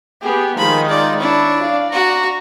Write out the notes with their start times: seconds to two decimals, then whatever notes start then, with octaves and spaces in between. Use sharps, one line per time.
0.22 B3 G4 G#4
0.58 D#3 F3 G#3 D#4 B5
0.89 F4 D5
1.20 D4 E4 C#5
1.64 D5 F5
1.93 F#4 A#5